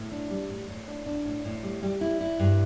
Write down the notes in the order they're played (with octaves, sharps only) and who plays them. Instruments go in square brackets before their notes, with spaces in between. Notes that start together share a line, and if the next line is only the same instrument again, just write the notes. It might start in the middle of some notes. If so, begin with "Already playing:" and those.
Already playing: [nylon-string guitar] A2
D4
G3
A2
A2
D4
D4
A2
A2
G3
G3
E4
E4
G2